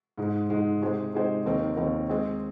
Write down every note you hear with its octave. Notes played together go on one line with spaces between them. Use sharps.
G#2 G#3 D#4
G#2 G#3 D#4
C3 G#3 D#4 G#4 C5
C3 G#3 D#4 G#4 C5
D#2 D#3 C4 D#4 A#4
D#2 D#3 C4 D#4 A#4
G#3 C4 G#4 D#5